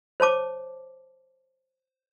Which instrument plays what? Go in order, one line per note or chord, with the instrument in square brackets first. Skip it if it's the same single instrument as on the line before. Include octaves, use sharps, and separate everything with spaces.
[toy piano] C5 C#5 A5 D6